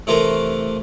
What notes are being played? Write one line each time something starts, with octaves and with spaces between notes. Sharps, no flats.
C3 E3 A3 F4 A#4